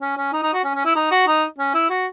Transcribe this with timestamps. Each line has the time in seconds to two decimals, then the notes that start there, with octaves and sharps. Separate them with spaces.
0.01 C#4
0.17 C#4
0.33 D#4
0.43 D#4
0.53 F#4
0.64 C#4
0.75 C#4
0.85 E4
0.96 D#4
1.11 F#4
1.27 D#4
1.58 C#4
1.75 E4
1.90 F#4